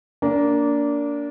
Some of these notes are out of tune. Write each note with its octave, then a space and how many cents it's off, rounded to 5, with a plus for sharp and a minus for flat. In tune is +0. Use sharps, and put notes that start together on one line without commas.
A#3 +0 D4 -20